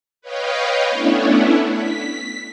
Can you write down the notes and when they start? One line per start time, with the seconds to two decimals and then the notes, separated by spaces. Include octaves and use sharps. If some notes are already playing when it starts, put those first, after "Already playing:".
0.22 B4 C#5 D#5 F5 G5
0.90 A3 B3 C#4 D4 E4
1.69 B6